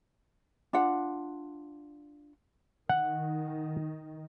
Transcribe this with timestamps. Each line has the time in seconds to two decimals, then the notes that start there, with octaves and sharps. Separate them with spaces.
0.73 D4 F4 F#5
2.89 D#3 F#5